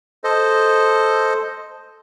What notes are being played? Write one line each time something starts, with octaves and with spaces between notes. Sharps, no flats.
A4 C5 D#5